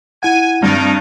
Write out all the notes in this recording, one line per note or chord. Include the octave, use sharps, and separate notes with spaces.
E4 F#5 G#5
G2 C4 D4 D#4